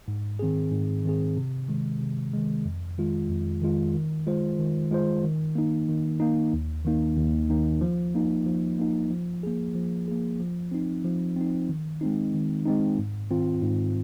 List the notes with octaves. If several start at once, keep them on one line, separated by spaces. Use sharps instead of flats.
G#2
D#3 C4 G#4
G#2
D#3 C4 G#4
C3
D#3 G#3
C3
D#3 G#3
F2
D#3 G#3 F4
F2
D#3 G#3 F4
D#3
G#3 F4 C5
D#3
G#3 F4 C5
D#3
A#3 D#4
D#3
A#3 D#4
D#2
D#3 A#3 D#4
D#2
D#3 A#3 D#4
F3
A#3 D#4
F3
A#3 D#4
F3
A#3 G#4
F3
A#3 G#4
F3
C4 D#4
F3
C4 D#4
D#3
G#3 C4 D#4
D#3
G#3 C4 D#4
G#2
D#3 C4 F4
G#2